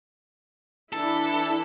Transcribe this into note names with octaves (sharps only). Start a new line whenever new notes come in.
E3 D4 E4 A4